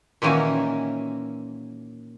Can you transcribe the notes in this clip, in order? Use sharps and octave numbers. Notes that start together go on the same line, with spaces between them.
A#2 D#3 E3 A#3 C#4 F#4